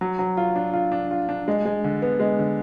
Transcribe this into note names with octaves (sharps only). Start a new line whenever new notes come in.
F#3
F#3
F4
D4
F4
D4
F4
D4
G#3
G#3
D3
B3
G#3
D3